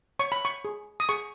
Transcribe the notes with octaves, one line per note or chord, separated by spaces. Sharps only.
C#5 C#6
B5
C#6
G#4
D#6
G#4 C#6